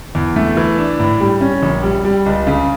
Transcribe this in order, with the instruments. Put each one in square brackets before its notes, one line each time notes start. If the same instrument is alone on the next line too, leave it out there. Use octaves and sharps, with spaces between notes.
[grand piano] E2
A3
E3
D4
A2
G3
C#4
A#1
G3
G3
C#2
C#3